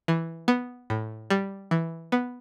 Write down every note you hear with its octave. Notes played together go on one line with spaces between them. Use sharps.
E3
B3
A2
G3
E3
B3